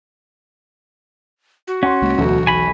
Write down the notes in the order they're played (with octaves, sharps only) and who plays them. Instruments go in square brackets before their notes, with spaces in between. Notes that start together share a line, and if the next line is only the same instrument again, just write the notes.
[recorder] F#4
[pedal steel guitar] C#4 [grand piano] F#5 C6
[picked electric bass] C2 G#3 A#3
[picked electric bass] E1 E3 F#3 [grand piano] D2 B2
[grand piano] B1 [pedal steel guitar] G#5 B5